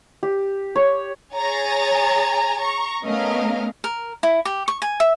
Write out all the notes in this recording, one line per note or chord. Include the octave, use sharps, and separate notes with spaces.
G4
C#5
G#4 C#5 G#5 A#5 A6
A#5 C#6
A3 B3 C#4 A#4 D#5 F5
A#4
E4
G4
C#6
G#5
E5